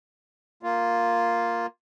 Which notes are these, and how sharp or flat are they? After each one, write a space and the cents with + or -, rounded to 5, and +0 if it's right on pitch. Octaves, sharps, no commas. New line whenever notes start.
A#3 +0 F4 +0